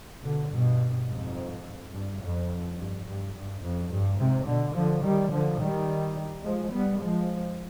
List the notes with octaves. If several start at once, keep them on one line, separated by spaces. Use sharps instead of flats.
B2 D3
G2 B2
F2 G#2
G2
F2
G2
G2
G2
F2
G2
G#2 C3
B2 D3
D3 F3
D#3 G3
D3 F3
D#3 G3
F3 G#3
G3 B3
F3 G#3